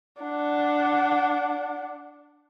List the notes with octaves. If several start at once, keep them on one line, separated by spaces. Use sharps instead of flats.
D4 F#5